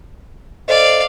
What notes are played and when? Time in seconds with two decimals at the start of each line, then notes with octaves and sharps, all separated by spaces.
0.68 A4 C5 D5 D#5 F5